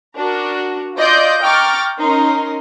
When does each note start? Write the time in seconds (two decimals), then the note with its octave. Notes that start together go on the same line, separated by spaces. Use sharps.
0.17 D4 F#4 A#4
0.97 F4 D5 D#5 C6 G6
1.43 G5 A#5 C#6 D6 F6 A6
1.98 C#4 D#4 A#4 C6